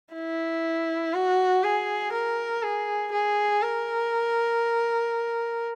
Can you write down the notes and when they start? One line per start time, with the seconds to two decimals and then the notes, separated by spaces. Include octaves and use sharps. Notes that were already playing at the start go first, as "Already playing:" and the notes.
0.14 E4
1.14 F#4
1.63 G#4
2.12 A#4
2.63 G#4
3.12 G#4
3.62 A#4